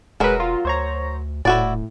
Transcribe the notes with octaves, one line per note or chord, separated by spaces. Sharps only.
E1 F#3 G#3 A#4 B4
F4
D2 C5 C#5 A#5
D#1 A2 E4 F#4 D5